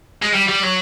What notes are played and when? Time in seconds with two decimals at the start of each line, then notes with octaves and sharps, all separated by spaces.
0.23 G#3
0.34 G3
0.49 G3
0.63 F#3